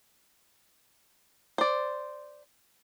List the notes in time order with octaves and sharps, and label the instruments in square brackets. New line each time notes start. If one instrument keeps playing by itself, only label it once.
[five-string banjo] C5 D5